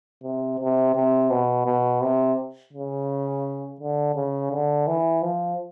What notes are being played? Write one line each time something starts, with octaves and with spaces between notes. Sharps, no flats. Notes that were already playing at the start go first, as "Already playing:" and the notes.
C3
C3
C3
B2
B2
C3
C#3
D3
C#3
D3
E3
F3